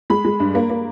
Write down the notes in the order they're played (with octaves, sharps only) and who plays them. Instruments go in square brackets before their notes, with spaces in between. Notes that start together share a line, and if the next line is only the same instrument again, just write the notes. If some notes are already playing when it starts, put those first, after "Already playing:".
[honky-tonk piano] G#3 B5
G#3
G2
A#3
A#3